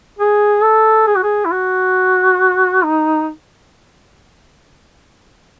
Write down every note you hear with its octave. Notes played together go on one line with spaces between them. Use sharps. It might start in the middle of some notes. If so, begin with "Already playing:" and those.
G#4
A4
G#4
F#4
G#4
E4
F#4
D#4